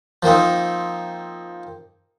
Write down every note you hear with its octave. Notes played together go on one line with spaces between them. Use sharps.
F3 A#3 C4 D#4